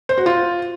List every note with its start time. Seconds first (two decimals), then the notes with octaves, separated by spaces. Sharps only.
0.09 C5
0.18 F#4
0.26 F4